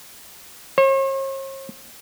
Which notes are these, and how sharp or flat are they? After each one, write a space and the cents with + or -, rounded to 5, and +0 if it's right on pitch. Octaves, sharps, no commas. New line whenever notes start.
C#5 -45